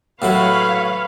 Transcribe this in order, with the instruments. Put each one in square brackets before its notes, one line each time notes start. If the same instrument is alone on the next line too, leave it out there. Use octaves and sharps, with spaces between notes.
[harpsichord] A2 F#3 E4 [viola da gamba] B4 [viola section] C#5 F5